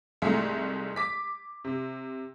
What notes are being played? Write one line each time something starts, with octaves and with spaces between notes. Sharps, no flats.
C2 G#2 E3 A3
D6 B6
C3